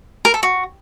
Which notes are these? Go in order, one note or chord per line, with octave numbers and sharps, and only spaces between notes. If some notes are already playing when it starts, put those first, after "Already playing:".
A#4
A4
F#4